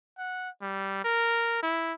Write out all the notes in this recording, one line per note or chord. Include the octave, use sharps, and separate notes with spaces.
F#5
G3
A#4
E4